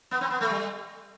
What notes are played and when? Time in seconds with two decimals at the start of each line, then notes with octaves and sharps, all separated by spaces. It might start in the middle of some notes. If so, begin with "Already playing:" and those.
0.11 B3
0.21 C4
0.31 B3
0.41 A3
0.50 G3